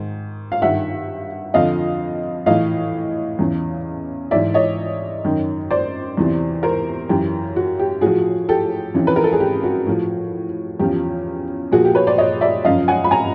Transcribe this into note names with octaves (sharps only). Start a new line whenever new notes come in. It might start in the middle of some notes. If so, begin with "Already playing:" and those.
Already playing: G#2 D#3
F5
G2 D#3 E5 F#5
F2 D3 F3 D#5 F5
A2 E3 D#5 F5
E2 C#3 E3
G#2 E3 D5 E5
C#5 D#5
F#2 D#3
C5 D5
E2 C3 E3
A#4 C5
F#2 C#3 E3 G4
F#4
G4
A2 F3 F#4 G#4
G4 A4
F2 C#3 E3
B4
A#4
A4
G#4
G4
F#4
A2 F3
E2 C#3 F3 G4
A#2 F3 F#4 G#4
G4
B4 C#5
C5 D5
C#5 D#5
D5 E5
F#2 C#3 F3 D#5 F5
F#5 G#5
B5
G#5 A#5